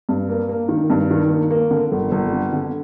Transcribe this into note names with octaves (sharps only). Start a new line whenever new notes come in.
G2
A#3
A#3
D#3
G2
D#3
A#3
A#3
D3
G1
G1
D3
D3